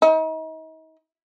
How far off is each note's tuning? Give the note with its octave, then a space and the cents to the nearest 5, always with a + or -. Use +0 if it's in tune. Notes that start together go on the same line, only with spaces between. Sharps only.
D#4 +40